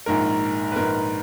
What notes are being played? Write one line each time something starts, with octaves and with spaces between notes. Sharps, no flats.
A#1 G#2 D#3 A#4
B4
A#1 G#2 D#3 A#4